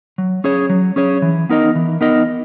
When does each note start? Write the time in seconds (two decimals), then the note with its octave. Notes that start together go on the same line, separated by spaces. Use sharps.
0.18 F#3
0.44 C#4 G#4 C#5
0.70 F#3
0.96 C#4 G#4 C#5
1.22 E3
1.49 B3 D#4 A#4 D#5
1.75 E3
2.01 B3 D#4 A#4 D#5